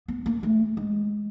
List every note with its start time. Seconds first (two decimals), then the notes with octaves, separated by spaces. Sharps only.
0.08 B3
0.26 A#3
0.43 A3
0.77 G#3